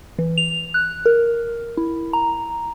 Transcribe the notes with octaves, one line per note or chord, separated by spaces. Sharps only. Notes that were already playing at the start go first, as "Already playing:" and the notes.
E3
F7
F#6
A#4
E4
A#5